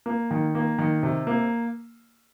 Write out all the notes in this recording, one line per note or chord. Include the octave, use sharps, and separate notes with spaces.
A#3
D#3
A#3
D#3
C3
A#3